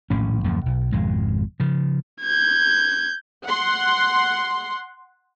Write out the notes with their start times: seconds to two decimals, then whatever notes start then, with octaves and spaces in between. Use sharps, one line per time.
0.10 D#1 A#1 A2 C#4
0.44 D1 F#2 F3 A#3
0.66 B1
0.92 G#1 F2 B2 G#3
1.60 C#3 F3
2.22 G6 G#6
3.46 F#5 C6